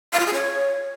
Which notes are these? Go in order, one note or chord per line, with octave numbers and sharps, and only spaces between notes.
F5
F4
G#4
C#5